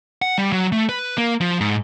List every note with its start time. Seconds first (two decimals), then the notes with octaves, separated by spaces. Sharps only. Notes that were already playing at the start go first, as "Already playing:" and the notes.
0.22 F#5
0.38 G3
0.52 F#3
0.72 A3
0.89 B4
1.18 A#3
1.41 F3
1.61 G#2